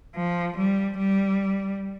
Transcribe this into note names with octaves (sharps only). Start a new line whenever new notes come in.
F3
G3
G3